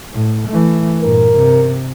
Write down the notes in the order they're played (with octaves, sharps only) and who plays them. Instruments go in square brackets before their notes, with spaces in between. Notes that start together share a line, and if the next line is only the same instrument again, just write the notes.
[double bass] A2
E3 A3
[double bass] G2 A#2 [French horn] A#4
[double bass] C3